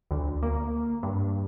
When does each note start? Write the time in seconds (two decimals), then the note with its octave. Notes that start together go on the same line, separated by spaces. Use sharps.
0.11 D2
0.43 A#3
1.03 G2